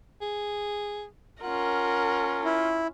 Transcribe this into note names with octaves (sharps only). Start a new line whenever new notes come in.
G#4
C#4 F4 A#4 F#5
E4